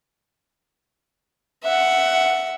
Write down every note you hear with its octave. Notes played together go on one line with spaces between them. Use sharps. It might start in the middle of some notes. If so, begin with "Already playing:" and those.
E5 F#5